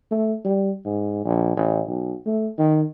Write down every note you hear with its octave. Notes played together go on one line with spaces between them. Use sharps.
A3
G3
G#2
A#1
A1
B1
A3
D#3